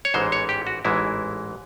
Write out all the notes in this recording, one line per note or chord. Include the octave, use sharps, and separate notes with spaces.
C#5
A1 G#2 E3 G#3 C5
C#5
G4
F#4
A1 G#2 E3 G#3 E4